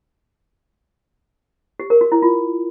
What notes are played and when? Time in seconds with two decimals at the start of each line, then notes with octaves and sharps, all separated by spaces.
1.80 G4
1.90 A#4
2.01 F#4
2.12 E4
2.22 F4